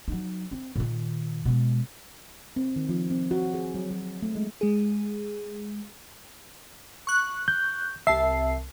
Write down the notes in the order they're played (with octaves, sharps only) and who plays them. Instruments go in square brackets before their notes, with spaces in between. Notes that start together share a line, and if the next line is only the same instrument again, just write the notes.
[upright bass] F#3 D#4
C4
A#2 D#3
B2 G#3
[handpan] C4
D#3
F3
C4
F#4
G#4
F#3
F#3
A3
G#3
[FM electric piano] G#3 G#4
[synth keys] C#6 F#6
[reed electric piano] G6
[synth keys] C2 A5 C7 [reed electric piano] E5